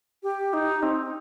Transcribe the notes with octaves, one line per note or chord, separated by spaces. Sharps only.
G4
D#4
C4